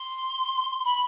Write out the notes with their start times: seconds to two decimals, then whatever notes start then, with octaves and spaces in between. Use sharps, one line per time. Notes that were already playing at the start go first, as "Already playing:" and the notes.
Already playing: C6
0.85 B5